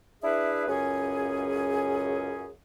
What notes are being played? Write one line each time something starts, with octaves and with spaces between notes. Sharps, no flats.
D4 E4 G#4 B4 E5
C#2 F#2 C#4 G#4